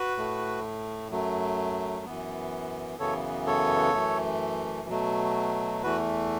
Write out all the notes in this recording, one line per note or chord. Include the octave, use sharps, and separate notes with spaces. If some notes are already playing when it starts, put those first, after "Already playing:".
Already playing: F#4 B4
A2 A3
F#2 F#3 A3
F#2 E3 B3
F#2 C#3 E3 B3 A4 C#5
A4 C#5
F#2 E3 A3
B2 F#3 A3
E2 E3 A3 F#4 B4